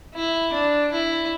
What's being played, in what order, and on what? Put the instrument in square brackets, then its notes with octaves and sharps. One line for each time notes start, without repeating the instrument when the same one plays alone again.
[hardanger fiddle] E4
D4
E4